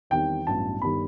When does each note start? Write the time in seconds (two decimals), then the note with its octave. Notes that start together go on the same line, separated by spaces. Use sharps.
0.10 E2 D#3 G3 C4 G5
0.46 A1 G2 F#3 B3 A5
0.82 G1 D#3 G3 B5